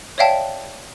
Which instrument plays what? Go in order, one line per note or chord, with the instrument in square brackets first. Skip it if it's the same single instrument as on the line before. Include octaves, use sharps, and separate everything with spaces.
[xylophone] C#5 D5 E5 F5 G5 A5